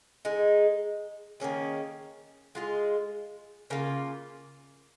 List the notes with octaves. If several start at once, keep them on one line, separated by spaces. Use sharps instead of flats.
G#3 D#4 G#4
D#3 A#3 C#4 G#4
G#3 F4 G#4
C#3 A#3 F4